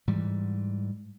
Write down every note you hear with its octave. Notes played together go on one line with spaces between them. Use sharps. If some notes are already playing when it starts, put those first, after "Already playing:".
G#2 E3 G3